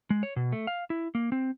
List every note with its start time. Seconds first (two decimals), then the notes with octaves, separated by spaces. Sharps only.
0.10 G#3
0.23 C#5
0.36 B2
0.52 A3
0.67 F5
0.90 E4
1.15 A#3
1.32 C4